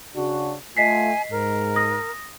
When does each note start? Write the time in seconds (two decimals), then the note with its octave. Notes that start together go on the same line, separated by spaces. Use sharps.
0.15 C#3 D4 F#4
0.77 A3 F4 D#5 G#5 B6 C7
1.31 G#2 A#4
1.76 D#6 A#6